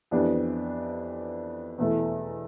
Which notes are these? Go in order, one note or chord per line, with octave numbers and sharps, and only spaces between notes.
F2 E3 B3 D4 G4
E2 B2 A3 E4 A4